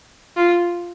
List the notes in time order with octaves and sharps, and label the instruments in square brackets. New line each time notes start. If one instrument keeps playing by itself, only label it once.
[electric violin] F4